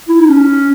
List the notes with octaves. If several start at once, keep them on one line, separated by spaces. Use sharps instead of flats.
E4
D#4
C#4